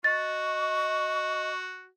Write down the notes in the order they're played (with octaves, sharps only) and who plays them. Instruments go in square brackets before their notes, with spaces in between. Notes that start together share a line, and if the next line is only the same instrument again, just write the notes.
[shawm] F#4 [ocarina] D#5 [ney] C#6 [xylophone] A6